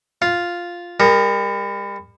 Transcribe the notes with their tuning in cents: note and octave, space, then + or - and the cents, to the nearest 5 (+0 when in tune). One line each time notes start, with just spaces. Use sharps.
F4 +0 F5 +0
G3 +40 A#4 +0 D#6 +0